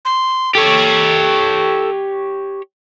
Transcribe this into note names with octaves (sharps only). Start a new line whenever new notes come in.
C6
G4 A4 C#5